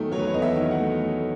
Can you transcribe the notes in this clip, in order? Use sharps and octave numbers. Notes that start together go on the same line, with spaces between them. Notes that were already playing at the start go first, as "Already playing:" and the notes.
Already playing: E2 D#3 F#3 A3
F#3 C#5
B4
C#5
E2 D#5
E5
D#3
F#5
A3